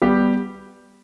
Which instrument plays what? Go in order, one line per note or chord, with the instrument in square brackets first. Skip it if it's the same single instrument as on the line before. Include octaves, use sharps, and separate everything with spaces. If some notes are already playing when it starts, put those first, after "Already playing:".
[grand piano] G3 B3 G4